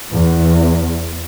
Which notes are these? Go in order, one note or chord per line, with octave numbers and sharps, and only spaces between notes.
E2